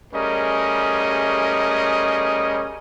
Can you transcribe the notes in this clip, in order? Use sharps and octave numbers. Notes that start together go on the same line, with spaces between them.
G3 A3 C#4 G#4 A#4 D#5